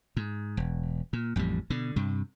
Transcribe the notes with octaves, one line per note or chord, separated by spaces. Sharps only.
G#2
E1
A#2
A1 F2 A2 G3
B2 D3
G2 C3